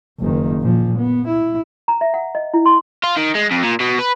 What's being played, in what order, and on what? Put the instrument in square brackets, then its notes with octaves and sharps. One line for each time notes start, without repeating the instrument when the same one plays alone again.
[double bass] F#1 D#3
A#2 F3
B3
E4
[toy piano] A#5
E5
F#5
D#5
E4
C6
[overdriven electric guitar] F4
D#3
G#3
F2
A#2
B2
B4